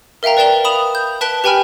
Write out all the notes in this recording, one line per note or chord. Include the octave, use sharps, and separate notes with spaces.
A#4 E5 F5 G5 A#5
B4 D5 G5 E7 G7
B5 D#6 E7 F7
G6
B4 A5 F#6 B6 D7 G7
G4 B4 G5 G#5 B5 F6